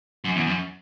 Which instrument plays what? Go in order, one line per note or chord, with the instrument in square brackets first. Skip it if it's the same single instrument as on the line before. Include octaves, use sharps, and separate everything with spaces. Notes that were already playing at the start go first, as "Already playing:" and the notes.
[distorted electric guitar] F#2
E2
F#2